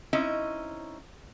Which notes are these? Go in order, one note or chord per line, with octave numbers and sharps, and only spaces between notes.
C4 C#4 D#4 E4 D#5